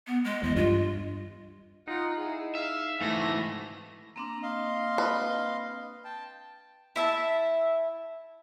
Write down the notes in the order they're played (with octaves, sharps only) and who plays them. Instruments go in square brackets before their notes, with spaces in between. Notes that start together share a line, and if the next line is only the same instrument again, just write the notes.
[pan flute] B3
G#3
[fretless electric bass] E2 [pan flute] D#5
[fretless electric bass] G2 [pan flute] F4
[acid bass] D#4 [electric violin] F4 F#5
[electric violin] E4 G#4
[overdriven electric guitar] E5 [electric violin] F5
[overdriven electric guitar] G#2 E3 [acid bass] A3 [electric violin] E5 A#6
[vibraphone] A#3 C4 D4 [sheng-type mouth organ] A#5
[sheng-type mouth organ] D#5 F5 C6
[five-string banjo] B4
[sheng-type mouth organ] G5 A5
[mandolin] E4 E5 A5